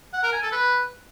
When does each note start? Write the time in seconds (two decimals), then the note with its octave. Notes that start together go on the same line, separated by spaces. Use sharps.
0.13 F#5
0.23 A#4
0.33 G#5
0.42 A4
0.52 B4